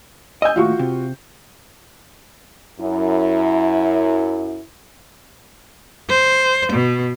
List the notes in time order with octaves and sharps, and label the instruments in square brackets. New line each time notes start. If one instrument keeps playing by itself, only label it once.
[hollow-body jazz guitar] D#5 G#5 [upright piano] E6 G6
[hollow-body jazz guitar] D#2 A2 [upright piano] F4 F#4 C#6
[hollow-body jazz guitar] C3
[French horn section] F#2 E4
[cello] C5
B2